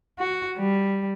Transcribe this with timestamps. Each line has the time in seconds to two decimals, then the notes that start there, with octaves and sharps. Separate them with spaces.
0.19 F#4
0.58 G3